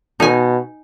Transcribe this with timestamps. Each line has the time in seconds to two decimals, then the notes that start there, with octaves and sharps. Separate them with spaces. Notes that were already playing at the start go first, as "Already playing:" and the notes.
0.20 B2 D#4 G#5